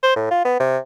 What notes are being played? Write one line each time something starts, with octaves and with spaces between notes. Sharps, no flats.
C5
A2
F4
B3
C3